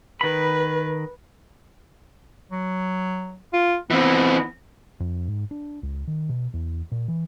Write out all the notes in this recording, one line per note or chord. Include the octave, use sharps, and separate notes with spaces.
D#3 B4 B5
F#3
F4
E3 B3 C4
F2
G#2
D4
C#2
D#3
B2
E2
A#2
E3